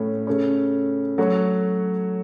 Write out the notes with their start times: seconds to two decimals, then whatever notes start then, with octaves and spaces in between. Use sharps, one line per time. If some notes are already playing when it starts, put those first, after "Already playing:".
Already playing: A2 A3 C#4
0.27 C#3 A3 C#4
1.18 F#3 A3 F#4 C#5